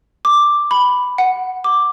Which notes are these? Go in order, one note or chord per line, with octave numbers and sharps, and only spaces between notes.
D6
B5
F#5
D6